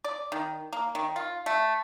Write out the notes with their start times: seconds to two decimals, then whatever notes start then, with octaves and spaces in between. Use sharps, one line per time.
0.04 D5
0.32 D#3
0.73 A#3
0.95 D#3
1.16 F4
1.46 A3